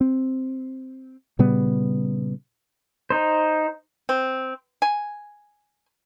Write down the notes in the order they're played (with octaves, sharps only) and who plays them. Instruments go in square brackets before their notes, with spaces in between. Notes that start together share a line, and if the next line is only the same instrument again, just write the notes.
[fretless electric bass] C4
A#2 C#3 G3 B3
[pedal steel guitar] D#4 C5
[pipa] C4
G#5